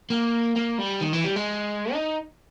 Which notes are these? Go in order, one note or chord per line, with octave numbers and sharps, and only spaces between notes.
A#3
A#3
G3
D#3
E3
G3
G#3
D#4